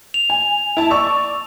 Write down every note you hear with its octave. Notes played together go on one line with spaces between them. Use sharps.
F7
G#5
E4 A5
D5 C#6 E6